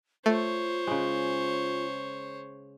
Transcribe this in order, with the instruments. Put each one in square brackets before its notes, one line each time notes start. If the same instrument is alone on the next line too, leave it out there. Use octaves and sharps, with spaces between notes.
[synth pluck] A3 [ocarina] F4 [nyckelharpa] C5 C#5
[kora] C#3 G#3